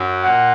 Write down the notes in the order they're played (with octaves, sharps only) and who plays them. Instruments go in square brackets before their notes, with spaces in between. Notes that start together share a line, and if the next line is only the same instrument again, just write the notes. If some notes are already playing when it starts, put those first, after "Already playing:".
Already playing: [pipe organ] F#2 F#3
[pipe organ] A#2 A#3 [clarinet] F#5